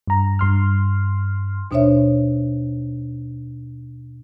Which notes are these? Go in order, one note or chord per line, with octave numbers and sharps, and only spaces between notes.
G2 A#5
G2 C6 F6
D#2 B2 D4 C5 C#5 E5